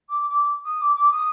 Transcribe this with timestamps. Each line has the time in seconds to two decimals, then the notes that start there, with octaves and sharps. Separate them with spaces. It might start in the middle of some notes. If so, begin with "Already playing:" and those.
0.09 D6
0.29 D6
0.64 D#6
0.80 D6
0.95 D6
1.11 D#6